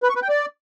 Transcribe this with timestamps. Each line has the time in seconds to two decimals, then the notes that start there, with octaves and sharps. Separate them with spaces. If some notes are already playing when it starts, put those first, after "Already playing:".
0.03 B4
0.09 C#6
0.16 B4
0.22 G5
0.29 D5